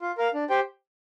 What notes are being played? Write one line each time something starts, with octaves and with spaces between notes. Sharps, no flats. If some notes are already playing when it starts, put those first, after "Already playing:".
F4
A#4 F5
D4
G4 C5 G5